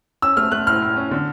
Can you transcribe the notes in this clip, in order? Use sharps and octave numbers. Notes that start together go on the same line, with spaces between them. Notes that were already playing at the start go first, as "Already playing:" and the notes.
C#4 E6
A3 F6
A3 F#6
A2 F6
A2
C#4
D3